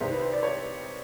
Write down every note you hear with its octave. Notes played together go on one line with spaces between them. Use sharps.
C2 C3 D#3 C5
B4
C5
D5
C#5